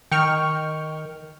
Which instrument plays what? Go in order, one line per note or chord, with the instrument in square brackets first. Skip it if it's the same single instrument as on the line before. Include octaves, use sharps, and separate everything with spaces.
[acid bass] D#3 [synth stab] G5 C#6 F6